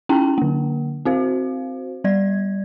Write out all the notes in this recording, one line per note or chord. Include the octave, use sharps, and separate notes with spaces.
C#4 D#4 E4 G5 A5 A#5
D3 A#3
C4 F#4 C5 F5
G3 D5 G#6